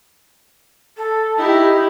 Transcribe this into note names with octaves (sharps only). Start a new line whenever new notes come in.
A4
D#4 E4 G4